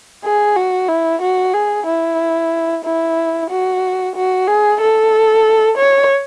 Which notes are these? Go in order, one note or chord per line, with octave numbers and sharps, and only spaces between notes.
G#4
F#4
E4
F#4
G#4
E4
E4
F#4
F#4
G#4
A4
C#5